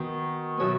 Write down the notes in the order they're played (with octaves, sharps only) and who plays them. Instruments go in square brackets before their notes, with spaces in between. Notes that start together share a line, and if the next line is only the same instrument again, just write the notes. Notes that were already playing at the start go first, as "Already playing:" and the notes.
Already playing: [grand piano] D#3 [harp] B3 D#4 F#4
[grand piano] B2 [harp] F#3 B3 F#4 C#5 E5